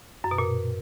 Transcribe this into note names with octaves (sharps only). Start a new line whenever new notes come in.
F#2
B2
A#2